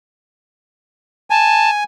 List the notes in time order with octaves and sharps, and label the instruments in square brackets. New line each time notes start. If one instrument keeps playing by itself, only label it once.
[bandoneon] G#5 [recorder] A5